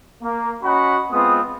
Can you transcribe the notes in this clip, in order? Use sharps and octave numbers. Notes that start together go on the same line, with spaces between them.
A#3
C#4 F#4 D#5 F#5 B5
G#3 B3 C4 F4 B4 D#6